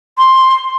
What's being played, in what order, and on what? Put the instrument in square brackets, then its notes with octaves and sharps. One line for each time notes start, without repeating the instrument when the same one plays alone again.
[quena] C6